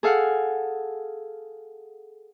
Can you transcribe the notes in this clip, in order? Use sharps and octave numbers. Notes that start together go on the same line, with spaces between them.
G#4 A4 F5 F#5